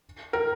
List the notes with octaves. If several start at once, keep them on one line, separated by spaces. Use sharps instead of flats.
A#4